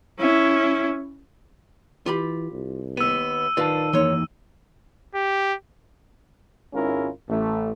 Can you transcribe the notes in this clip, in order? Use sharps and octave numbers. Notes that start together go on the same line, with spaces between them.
C#4 E4
E3 F4 G4 B5
C2
D#2 B3 E6 D#7
D#3 F4 B4 D5 F5 A5
E3 A#3 D#4 C#5 C6
G4
G#1 G#2 C#4 E4 F4 A#4
A1 A3